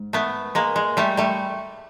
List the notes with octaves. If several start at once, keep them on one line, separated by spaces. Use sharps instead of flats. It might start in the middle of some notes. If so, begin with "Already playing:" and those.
Already playing: G#2
A3 B3
G#3 A#3
G#3
G3 A3
G3 A3